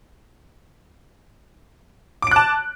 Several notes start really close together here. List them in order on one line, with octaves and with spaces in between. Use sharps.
D6 D7 F#6 A5